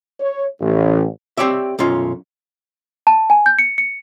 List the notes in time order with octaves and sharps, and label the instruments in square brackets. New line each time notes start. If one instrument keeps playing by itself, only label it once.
[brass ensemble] C#5
A1
[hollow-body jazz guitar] C4 G4 C#5 D5 E5
B1 F#2 C#4 F4
[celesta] A5
G#5
G6
C#7
C#7